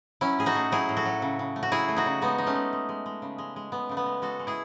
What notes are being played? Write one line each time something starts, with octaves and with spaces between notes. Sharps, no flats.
F#3 C#4 E4
A2 G#4
D#4 F#4
A3
F#3 E4 G#4
A2
F#4 A4
F#3
C#3
C#3
A3
F#4
F#3 E4 G#4
A3
D#4 F#4
C#3
G#3 B3 D#4
G#3 D#4
A3 C#4
G#3
G#3
G#3
G#3
C#3
G#3
G#3
G#3 B3
C#3 A3
B3
G#3
G#3 F#4 A4
G#3
E4 G#4